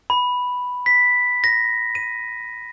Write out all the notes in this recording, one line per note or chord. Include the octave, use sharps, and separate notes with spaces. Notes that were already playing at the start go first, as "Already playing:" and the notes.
B5
B6
A#6
D#7